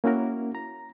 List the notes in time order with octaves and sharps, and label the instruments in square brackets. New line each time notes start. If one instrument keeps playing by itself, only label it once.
[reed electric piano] A#3 C#4 E4 F#4 A#4
A#5